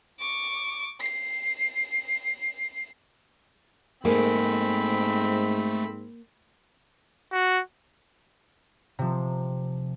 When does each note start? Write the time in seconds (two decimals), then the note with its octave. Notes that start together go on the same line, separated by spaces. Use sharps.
0.20 C#6 D6
1.00 C7
4.05 G#2 A3 A#3 C4 G#4 B5
7.32 F#4
8.99 C3 F3